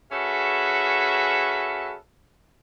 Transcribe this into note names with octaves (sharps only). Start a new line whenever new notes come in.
C#4 F#4 G#4 A4 B4 E5